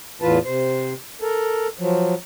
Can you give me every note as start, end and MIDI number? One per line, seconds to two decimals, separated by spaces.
0.22 0.38 40
0.22 0.38 45
0.22 0.38 52
0.22 0.38 65
0.22 0.38 71
0.22 0.38 81
0.45 0.93 48
0.45 0.93 72
1.21 1.67 69
1.21 1.67 70
1.79 2.14 53
1.79 2.14 54